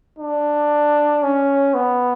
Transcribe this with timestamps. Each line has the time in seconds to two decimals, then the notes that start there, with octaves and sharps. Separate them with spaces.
0.18 D4
1.23 C#4
1.74 B3